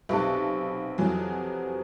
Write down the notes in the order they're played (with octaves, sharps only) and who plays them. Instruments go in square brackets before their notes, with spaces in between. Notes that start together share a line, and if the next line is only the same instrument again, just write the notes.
[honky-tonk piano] B1 A5 [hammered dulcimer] C3 F#4 B4
[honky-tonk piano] F2 E3 F#3